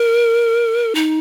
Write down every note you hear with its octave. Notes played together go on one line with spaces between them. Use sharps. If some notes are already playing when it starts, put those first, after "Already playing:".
Already playing: A#4
D#4